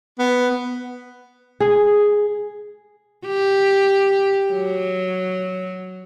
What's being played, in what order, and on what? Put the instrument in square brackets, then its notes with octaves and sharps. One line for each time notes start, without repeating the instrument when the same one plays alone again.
[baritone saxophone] B3
[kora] G#4
[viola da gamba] G4
F#3